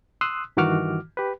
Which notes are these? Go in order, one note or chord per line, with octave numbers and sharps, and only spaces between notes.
C6 D#6 E6 F#6
G2 D#3 E3 F#4 D6 F6
G4 B4